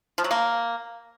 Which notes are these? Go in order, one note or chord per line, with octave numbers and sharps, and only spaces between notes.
F3
F#3
A#3